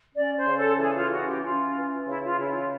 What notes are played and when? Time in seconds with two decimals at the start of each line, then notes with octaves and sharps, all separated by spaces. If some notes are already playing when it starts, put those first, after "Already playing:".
0.15 C#4 D5
0.37 C5
0.47 C#3
0.57 A4
0.80 E3 G#4
0.96 F4
1.11 C#4 F#4
1.28 G4
1.43 C#4 F4
1.76 E3
2.08 C#3 E4
2.24 F4
2.39 C#3 E4
2.55 F4